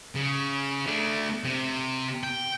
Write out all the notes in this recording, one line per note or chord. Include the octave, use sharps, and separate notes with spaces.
C#3
A3 D4
C3
G5